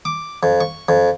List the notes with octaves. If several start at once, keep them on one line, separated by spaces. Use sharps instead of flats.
D6
F2
C#6
F2